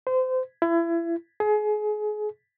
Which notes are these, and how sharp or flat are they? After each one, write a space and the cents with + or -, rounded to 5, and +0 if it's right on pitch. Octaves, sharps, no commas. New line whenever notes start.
C5 -30
E4 +30
G#4 +30